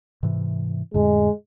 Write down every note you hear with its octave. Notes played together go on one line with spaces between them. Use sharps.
G#2 C3 E3
F2 A2 D3 G#3